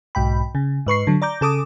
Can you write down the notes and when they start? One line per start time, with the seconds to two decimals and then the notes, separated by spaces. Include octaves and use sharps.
0.15 B1 G#2 G5 B5
0.55 C#3
0.86 G#2 B4 C#6 C7
1.07 D3 F#3
1.22 D5 A#5 D6 G6
1.41 C#3 A4 D6 D#6